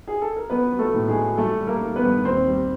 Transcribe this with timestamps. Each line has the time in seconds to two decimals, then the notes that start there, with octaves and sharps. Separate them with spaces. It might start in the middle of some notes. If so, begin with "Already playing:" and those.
0.08 G#4
0.22 A4
0.37 A#4
0.50 F#3 B3 B4
0.72 F#3
0.79 A3 A4
0.94 A2
1.08 G#3 G#4
1.16 F#3
1.37 G3 A3 A4
1.60 G3
1.67 A#3 A#4
1.82 G3
1.96 B3 B4
2.03 G2
2.25 D#2 C4 C5
2.47 G3